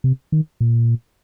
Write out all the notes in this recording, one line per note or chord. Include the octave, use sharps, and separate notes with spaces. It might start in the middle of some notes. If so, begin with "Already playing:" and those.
C3
D#3
A#2